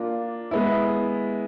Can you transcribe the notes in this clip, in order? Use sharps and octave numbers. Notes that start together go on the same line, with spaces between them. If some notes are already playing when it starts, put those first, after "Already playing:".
Already playing: A#3 D4 F4
G#3 B3 E4